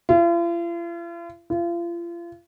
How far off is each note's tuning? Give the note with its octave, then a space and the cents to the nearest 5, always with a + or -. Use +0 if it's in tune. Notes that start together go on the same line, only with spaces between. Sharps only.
F4 -45
F4 -35